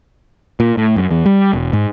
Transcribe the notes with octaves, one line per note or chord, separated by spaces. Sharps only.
A#2
A2
F#2
E2
G3
E1
G#2